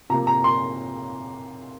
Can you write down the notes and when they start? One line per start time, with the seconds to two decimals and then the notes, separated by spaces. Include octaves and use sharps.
0.10 C3 F3 A#3 A#5
0.27 A#5
0.44 C6